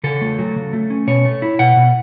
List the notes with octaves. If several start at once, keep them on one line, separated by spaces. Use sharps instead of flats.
C#3 A4
A3
F#3
C#3
A3
C#4
B2 C#5
A3
E4
B2 F#5
B2